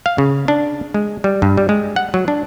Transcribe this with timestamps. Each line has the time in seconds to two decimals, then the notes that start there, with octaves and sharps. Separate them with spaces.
0.06 F5
0.18 C#3
0.48 D4
0.94 G#3
1.24 G3
1.42 G2
1.57 G3
1.69 G#3
1.96 F#5
2.14 F#3
2.28 D4